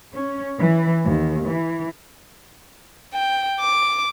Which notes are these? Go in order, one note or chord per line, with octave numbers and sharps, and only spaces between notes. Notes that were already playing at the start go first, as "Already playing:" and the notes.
C#4
E3
D#2
E3
G5
D6